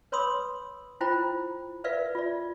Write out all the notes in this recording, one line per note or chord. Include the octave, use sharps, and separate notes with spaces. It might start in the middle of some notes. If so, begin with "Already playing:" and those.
B4 C#5 B5 C6 D#6 E6
E4 F4 C5 G5 A#5 B5
A#4 B4 D5 E5 F5
F4 D5